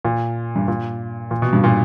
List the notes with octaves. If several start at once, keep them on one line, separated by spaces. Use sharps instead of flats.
A#2
G2
A#2
A#2
B2
G2
A#2